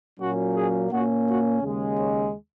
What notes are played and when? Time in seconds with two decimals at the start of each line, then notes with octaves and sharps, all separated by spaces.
0.20 A#2 F#3 A#3 C#4 F#4
0.56 G#4
0.92 A#2 A#3 C#4 F#4
1.27 F#4
1.63 D#2 C#3 G#3
1.99 C#5